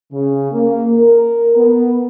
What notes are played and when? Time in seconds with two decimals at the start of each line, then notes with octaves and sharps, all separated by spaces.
0.12 C#3
0.52 A#3
0.98 A#4
1.56 B3